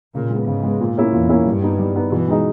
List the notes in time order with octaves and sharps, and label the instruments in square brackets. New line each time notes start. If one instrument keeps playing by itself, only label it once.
[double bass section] A#2 [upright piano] C#3
[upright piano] G#3 B3
[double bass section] G#2 [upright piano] C#3
[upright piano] G#3 B3
A#2
A#3 C#4 E4
[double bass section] E2 [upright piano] A#2
[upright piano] A#3 C#4 E4
[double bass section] G2 [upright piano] G3
[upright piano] B3 D#4
G3
B3 D#4
[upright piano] B2 [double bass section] E3
[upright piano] G#3 D#4 G#4 D#5